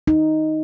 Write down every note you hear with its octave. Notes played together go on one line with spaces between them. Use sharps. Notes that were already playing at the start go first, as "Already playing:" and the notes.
D#4